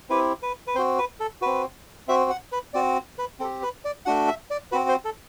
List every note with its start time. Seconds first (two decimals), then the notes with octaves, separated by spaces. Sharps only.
0.10 C4 E4 G4 B4
0.42 B4
0.67 B4
0.75 C4 C5
0.78 F#4
0.98 B4
1.20 A4
1.42 C4 F#4 B4
2.08 C4 F#4 E5
2.30 F#5
2.52 B4
2.74 C4 F#4 D5
3.19 B4
3.40 C4 A4
3.44 G4
3.63 B4
3.85 D5
4.06 A3 D4 F#4 F#5
4.28 E5
4.50 D5
4.72 C4 F#4 B4
4.89 C5
5.05 A4